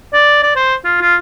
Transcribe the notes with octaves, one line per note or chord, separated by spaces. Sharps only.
D5
D5
C5
F4
F4